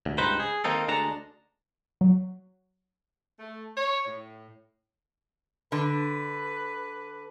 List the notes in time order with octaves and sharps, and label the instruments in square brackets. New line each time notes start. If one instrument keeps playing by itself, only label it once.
[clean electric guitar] D2
C#2 G2 D#4 B4 C5
G#4
D#3 A#3 C4 D#4 A4
D2 G#3 D4 A4 A5 A#5
[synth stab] F#3
[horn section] A3
C#5
A2
[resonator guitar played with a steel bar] D3 [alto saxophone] B4